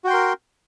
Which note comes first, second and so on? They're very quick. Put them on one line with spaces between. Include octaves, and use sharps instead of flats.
F#4 G5 C6 A#4